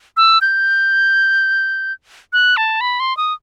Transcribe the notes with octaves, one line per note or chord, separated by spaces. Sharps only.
E6
G6
F#6
A5
B5
C6
D#6